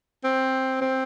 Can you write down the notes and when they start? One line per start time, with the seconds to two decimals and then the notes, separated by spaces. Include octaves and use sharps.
0.24 C4
0.81 C4